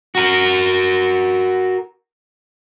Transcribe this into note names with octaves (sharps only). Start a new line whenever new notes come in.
F#4 A#4